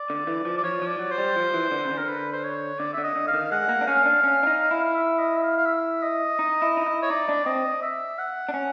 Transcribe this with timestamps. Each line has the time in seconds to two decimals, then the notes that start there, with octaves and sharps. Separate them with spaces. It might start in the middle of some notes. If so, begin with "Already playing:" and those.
Already playing: D5
0.10 D3
0.27 E3
0.45 F3
0.57 D5
0.64 F3 C#5
0.82 F3
0.87 D5
0.99 F#3
1.11 C5
1.18 G3
1.36 F3
1.54 E3
1.71 D3
1.85 C#3
1.90 D3
1.98 A#4
2.08 B4
2.33 C5
2.44 C#5
2.79 D3 D5
2.93 D3 E5
3.04 D#5
3.16 D3
3.27 F5
3.34 D#3
3.51 G#3 F#5
3.69 A#3
3.81 D4
3.87 C#4 F5
4.05 D4
4.24 C#4
4.43 D4
4.47 D#4
4.71 E4
4.84 F5
4.95 E5
5.19 D#5
5.37 E5
5.43 F5
5.57 F5
5.66 E5
6.03 D#5
6.39 D#4
6.62 E4
6.77 D#4
6.86 E4
7.02 C#5
7.10 D#4 D5
7.29 D4
7.46 C4 D#5
7.82 E5
8.19 F#5
8.49 D4
8.54 C#4